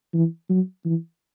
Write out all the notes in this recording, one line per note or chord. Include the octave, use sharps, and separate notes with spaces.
E3
F#3
E3